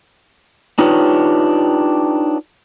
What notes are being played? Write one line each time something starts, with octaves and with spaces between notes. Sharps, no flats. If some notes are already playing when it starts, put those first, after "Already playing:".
D4 D#4 F4 G4 B4 C#5